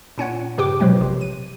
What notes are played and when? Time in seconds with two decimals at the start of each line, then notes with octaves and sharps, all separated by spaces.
0.18 A#2 C#4 C#5 F#5
0.58 G2 C#3 G4 B4 G5 D6
0.80 B2 F3 F#3 G#3 C4
0.99 A#1 C3
1.21 D#7